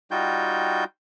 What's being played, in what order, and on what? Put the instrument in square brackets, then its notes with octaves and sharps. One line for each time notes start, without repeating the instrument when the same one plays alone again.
[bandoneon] G3 D#4 F4 F#4 G5 G6